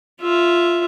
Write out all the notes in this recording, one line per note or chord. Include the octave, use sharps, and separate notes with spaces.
F4 E5